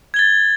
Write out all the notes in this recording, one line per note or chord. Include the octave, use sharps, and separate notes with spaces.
G#6 A6 G7